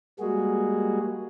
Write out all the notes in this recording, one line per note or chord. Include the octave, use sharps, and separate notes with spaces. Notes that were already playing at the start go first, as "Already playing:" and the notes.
G3 G#3 A#3 F#4 G#4